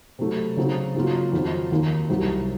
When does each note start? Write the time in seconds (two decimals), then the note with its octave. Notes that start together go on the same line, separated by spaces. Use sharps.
0.19 C3 F#3 A3
0.57 C#3 F#3 C4 D#4
0.95 C#3 F#3 A#3 F4
1.33 F2 D#3 F#3 C4 F4
1.71 D#2 D#3 A#3
2.09 C2 C3 F#3